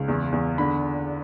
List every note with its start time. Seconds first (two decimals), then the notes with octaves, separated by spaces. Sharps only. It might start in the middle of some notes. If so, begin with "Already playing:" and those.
Already playing: C#2
0.08 E2
0.32 E2
0.58 D3 B5